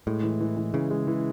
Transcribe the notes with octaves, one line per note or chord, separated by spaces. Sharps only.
A2 G#3
E3
E3
E3
C#3 E3
G#3
E3